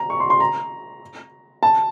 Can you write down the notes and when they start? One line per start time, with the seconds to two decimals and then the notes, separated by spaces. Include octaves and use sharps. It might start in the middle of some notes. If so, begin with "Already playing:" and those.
Already playing: A#5
0.10 C#6
0.20 C6
0.30 C6
0.40 A#5
1.63 A5